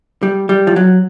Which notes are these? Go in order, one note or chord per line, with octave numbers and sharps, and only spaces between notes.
G3
G3
F3
F#3